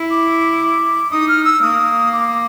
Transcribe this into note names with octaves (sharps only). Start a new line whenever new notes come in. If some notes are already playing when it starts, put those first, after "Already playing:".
Already playing: E4
D6
D#4 D#6
F6
E6
A#3 D#6
D6